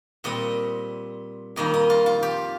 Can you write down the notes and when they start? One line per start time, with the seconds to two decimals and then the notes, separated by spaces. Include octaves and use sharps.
0.24 A#2 G3 C4 D#5
1.56 F2 D#3 G3 A#3 D#5
1.74 D#5
1.90 F4
2.06 F4
2.23 G4